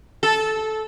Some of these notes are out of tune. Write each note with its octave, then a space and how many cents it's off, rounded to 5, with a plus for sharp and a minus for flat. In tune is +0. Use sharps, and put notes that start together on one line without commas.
A4 -15